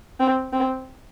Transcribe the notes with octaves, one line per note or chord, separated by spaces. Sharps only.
C4
C4